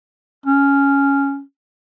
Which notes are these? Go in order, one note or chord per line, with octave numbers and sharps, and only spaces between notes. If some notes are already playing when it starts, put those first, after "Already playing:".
C#4